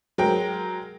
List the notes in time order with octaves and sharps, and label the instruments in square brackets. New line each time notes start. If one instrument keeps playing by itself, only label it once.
[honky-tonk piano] F#3 G#3 A#4 G5